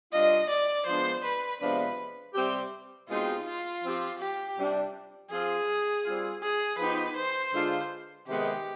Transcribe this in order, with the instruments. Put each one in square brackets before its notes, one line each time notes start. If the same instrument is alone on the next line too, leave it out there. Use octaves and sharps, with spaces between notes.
[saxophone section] C3 G3 D4 F4 [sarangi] D#5
[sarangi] D5
[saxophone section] F3 G#3 B3 D4 [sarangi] C5
[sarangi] B4
[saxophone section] C3 F3 G#3 B3 D4 [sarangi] B4
[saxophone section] C3 G3 C4 G4
[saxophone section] B2 G#3 C4 D#4 G4 [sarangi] F4
[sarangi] F4
[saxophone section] F3 C4 G4
[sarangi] G4
[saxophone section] C3 G3 D4
[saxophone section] F3 C4 F4 [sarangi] G#4
[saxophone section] G3 C4 F4
[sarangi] G#4
[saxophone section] F3 B3 D#4 G4 [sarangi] B4
[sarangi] C5
[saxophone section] D3 G#3 D4 F4
[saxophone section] C3 D#3 G#3 B3 [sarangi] G4